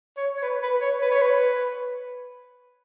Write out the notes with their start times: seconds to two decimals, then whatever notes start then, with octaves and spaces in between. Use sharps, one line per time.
0.17 C#5
0.38 C#5
0.43 B4
0.63 B4
0.81 C#5
1.02 B4
1.11 C#5
1.21 B4